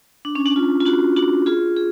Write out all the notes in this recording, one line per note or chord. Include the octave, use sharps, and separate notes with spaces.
D4
C#4
D4
F4
F4
D4 F#4
D4 F#4
F4 G#4
G#4